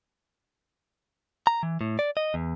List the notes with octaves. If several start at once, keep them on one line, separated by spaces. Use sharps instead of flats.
A#5
E3
A2
D5
D#5
E2